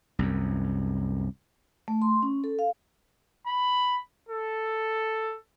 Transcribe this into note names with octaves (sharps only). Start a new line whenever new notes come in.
C2 F#2
A3
C6
C#4
A4
F5
B5
A4